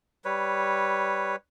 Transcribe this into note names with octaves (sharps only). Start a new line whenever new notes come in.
G3 B4 C#5